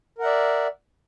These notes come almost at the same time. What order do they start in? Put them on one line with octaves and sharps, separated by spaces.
A#4 F#5 E5 D5